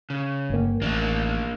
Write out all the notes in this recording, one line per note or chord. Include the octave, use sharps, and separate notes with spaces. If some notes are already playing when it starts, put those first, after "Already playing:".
C#3
G1 A#3
A1 A#3 D4